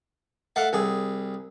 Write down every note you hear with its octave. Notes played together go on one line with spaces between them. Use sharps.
A3 F5 F#5
C2 G#4